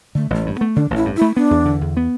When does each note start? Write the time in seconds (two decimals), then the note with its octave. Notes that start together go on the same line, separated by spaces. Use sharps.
0.15 D3 A3
0.30 A1 A3
0.46 G2
0.55 B3
0.61 A3
0.76 D3 D4
0.90 A1
0.96 E4
1.05 G2
1.16 E4
1.21 A3
1.36 B3 D4
1.51 E2
1.65 D3
1.81 E2
1.97 B3